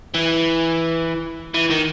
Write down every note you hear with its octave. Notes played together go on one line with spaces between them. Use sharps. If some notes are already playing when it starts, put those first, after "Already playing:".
E3
E3
D#3